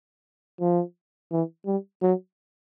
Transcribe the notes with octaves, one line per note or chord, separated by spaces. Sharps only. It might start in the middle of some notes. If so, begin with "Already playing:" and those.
F3
E3
G3
F#3